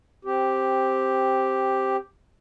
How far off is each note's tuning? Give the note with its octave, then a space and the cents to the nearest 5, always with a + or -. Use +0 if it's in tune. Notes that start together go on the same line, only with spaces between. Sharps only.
C4 +5 G4 +0